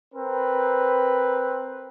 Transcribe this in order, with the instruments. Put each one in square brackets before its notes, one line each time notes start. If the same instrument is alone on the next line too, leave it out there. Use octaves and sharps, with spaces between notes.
[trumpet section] C4 A#4 B4